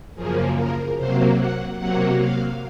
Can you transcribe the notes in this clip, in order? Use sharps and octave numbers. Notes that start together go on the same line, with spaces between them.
F#2 C#3 F3 A#3 G#4
A#4
C3 F#3 A#3 C5
F#5
C3 F#3 A#3 F#5
F5